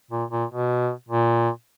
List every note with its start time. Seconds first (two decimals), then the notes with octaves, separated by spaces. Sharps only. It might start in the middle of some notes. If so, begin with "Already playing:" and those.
0.11 A#2
0.31 A#2
0.50 B2
1.08 A#2